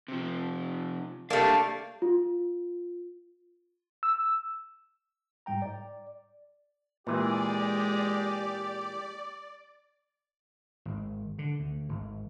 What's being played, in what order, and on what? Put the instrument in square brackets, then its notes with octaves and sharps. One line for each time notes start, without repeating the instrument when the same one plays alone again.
[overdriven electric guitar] C3 F3
[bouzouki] G3 D4 [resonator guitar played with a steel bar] A3 A#3 [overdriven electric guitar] F5
[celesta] F4
[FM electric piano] E6
[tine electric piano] G#2 G3 G5 A#5
D5
[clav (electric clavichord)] A#2 E3 [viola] G#3 G#4 [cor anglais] G4 [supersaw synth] D5
[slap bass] G#1
D3
D2
G#1